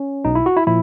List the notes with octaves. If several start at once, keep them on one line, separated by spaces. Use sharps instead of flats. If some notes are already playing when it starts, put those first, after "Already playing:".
Already playing: C#4
B1 B2 D#4
E4
F#4
E4
A#2 F3 E4